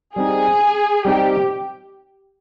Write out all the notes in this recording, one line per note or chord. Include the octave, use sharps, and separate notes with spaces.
G3 C4 D#4 G#4
G3 C4 D#4 G4